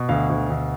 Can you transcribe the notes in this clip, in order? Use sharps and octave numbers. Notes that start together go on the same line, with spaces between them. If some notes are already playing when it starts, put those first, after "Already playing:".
Already playing: B2
D2 F5
D2
D2